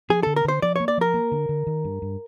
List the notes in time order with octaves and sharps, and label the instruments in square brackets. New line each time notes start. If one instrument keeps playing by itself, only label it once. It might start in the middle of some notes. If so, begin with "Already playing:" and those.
[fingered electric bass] F3 [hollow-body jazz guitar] G#4
[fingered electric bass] D3 [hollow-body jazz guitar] A4
[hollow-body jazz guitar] A#4
[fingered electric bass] D3 [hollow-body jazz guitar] C5
[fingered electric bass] F3 [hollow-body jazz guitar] D5
[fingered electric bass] A#3 [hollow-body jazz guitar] C#5
[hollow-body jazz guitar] D5
[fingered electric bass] F3 [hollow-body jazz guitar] A#4
[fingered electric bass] A#3
D3
D3
D#3
G2
G2